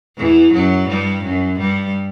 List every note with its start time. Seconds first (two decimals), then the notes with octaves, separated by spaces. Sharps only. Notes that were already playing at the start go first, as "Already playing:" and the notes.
0.17 E2 E3
0.53 F#2 F#3
0.88 G2 G3
1.24 F#2 F#3
1.59 G2 G3